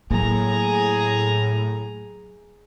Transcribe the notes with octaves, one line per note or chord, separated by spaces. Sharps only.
A2 F#3 A#3 G#4 A#5